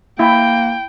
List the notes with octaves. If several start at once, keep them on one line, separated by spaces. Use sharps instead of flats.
A#3 E4 G5